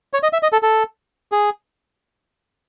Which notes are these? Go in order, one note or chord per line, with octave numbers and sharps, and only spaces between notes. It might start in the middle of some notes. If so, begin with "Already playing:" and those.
C#5
D#5
E5
D#5
A4
A4
G#4